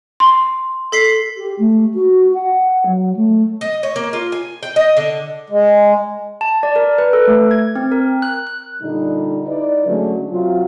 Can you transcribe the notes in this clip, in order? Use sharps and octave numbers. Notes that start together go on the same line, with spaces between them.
C6
A4 B6 C7
G4
A3
F#4
F#5
F#3
A3
D#5
C#5
A#3
F4
G#5
G5
D#5
D3
G#3
A5
D5
A#4
B4
A4
A3
G#6
C4
A#4
F#6
F#6
A#2 D3 G3 D#4
D#4 E4 B4 D5
D3 F#3 G#3 A3 C#4
C3 F#3 F4